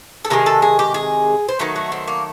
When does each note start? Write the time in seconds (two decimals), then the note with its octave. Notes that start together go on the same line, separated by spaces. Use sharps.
0.25 A4
0.30 C3 D#3 G#3 A#4
0.46 A4
0.62 G#4
0.79 G4
0.94 G#4
1.49 C5
1.59 D#3 F#3 A3 B4
1.76 F#4
1.92 C4
2.08 A#3